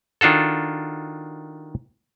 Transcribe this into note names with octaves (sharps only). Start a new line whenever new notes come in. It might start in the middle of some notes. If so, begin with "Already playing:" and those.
D#3 D4 F4 F#4 A4